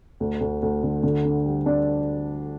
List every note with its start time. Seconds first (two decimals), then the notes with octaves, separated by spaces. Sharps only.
0.20 D2
0.41 D2
0.62 D2
0.83 D3
1.03 D3
1.25 D4
1.46 G3
1.66 D4